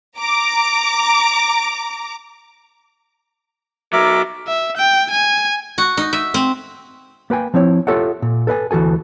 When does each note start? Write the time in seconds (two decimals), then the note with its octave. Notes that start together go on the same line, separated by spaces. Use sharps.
0.19 A#5 D6
3.93 B2 F#3 A#4 E5 D6
4.47 E5
4.77 G5
5.11 G#5
5.78 F#4
5.97 D#4
6.13 E5
6.34 C4
7.30 A#3 B4 G5 G#5
7.54 F3 C4 E4 C#5
7.87 F4 G4 A4 C#5 E5 F#5
8.22 A#2
8.47 A4 B4 D#5 G#5
8.71 D2 E3 F#4 A4 G#5